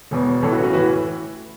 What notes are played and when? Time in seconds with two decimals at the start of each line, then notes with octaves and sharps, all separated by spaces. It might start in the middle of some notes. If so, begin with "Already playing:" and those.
0.11 E1 E2 B2
0.42 A1 A2 E3 A4 C#5
0.52 F#4 B4
0.63 C#4 F#4
0.73 A2 E3 F#4 B4